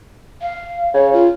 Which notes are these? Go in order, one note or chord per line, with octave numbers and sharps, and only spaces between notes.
F5
C#3 C#5
F4